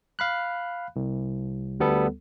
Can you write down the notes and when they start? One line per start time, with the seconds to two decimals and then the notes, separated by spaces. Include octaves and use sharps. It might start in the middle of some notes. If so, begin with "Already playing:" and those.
0.19 F5 B5 F#6
0.96 C2
1.80 D2 G3 B3 A4